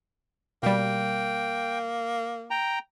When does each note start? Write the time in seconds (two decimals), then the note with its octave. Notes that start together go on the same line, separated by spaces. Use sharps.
0.63 B2 G3 A#3 G5
2.51 G5 A#5